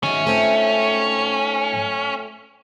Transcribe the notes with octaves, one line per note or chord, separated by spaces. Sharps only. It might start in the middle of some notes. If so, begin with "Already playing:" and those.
D#3 G#3 A3 C#4 F#4
G#2 A3 C4 F4